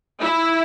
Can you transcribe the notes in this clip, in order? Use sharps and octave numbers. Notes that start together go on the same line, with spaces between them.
E4